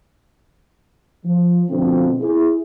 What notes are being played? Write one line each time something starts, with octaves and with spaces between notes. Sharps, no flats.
F3
B2 D3 F3 A3 C4
E4 G#4